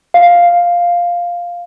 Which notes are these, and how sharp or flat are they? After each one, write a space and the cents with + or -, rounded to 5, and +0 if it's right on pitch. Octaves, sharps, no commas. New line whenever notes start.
F5 +0